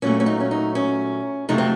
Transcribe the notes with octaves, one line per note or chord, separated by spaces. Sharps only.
A#2 F#3 A3 C#4
C#4
D#4
C#4
D#4
C#4
F2 C3 F#3 A3 D#4
C4